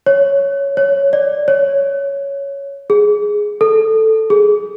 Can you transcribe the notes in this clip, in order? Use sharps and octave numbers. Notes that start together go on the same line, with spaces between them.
C#5
C#5
D5
C#5
G#4
A4
G#4